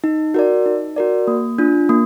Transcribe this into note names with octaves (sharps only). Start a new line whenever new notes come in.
D#4
F#4 A#4 D5
D#4
F#4 A#4 D5
A#3
D4 F4
A#3